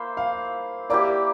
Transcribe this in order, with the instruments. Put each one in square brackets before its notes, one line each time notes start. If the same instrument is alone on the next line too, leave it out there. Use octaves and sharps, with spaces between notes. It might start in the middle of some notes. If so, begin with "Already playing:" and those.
Already playing: [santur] A#3 E4 C5 [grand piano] F5
[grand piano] F5
[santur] A#3 E4 G4 [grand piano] D5